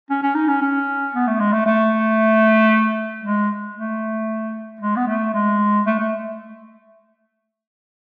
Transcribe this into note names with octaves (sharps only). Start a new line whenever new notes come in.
C#4
C#4
D#4
C#4
C#4
B3
A3
G#3
A3
A3
G#3
A3
G#3
B3
A3
G#3
A3
A3